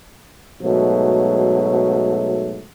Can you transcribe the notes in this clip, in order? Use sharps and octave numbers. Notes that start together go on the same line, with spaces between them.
G#2 B2 F#3 A3